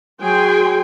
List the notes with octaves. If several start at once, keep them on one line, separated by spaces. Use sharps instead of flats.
F#3 G#4 G5 G#5 C6